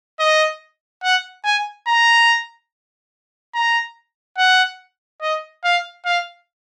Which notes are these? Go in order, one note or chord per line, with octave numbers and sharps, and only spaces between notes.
D#5
F#5
G#5
A#5
A#5
F#5
D#5
F5
F5